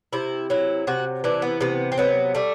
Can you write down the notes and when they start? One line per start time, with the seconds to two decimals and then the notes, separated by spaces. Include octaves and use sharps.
0.13 C3 E4
0.50 F#3 E4
0.87 C3 F#4
1.24 E3 D4
1.42 B3
1.60 C3 B3
1.92 C4
1.98 F#3 B3
2.35 G3 A3